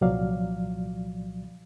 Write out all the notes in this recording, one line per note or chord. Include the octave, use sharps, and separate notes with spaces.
C2 A#2 F3 F#3 D5 F5